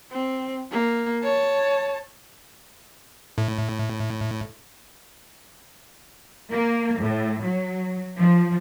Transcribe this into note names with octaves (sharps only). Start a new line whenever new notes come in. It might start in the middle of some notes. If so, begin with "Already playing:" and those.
C4
A#3
C#5 A5
A2
A#3
A2
F#3
F3